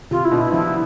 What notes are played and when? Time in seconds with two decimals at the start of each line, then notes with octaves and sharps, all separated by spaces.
0.11 C3 F4
0.25 E4
0.31 B2 D3
0.39 E4
0.52 D3 F3 E4